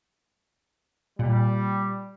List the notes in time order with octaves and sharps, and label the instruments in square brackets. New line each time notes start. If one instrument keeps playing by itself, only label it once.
[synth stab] A#2 [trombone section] G3